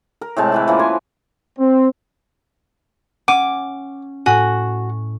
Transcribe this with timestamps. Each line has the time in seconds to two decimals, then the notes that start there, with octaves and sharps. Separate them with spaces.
0.21 A#4
0.36 A2 C3 G#3 A5
0.52 E3 E4 B4
0.68 E3 F3 A#3 C#4
0.79 B4 G#5 C6
1.59 C4
3.28 C#4 F#5 D6 D7 D#7
4.26 A2 F#4 G#5 C#6